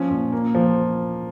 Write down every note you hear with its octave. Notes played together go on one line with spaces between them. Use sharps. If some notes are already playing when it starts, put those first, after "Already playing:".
Already playing: F3 C#4
A#2
A#3
F3